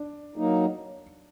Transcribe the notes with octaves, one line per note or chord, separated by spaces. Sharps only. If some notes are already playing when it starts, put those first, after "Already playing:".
Already playing: D4
F#3 A#3 D#4